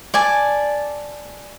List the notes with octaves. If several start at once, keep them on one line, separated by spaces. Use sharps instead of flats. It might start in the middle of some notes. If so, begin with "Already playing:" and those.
D5 G#5 A5